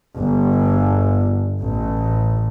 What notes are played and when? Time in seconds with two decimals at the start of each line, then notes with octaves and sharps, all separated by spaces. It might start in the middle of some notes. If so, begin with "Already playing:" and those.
0.17 G1
1.61 A1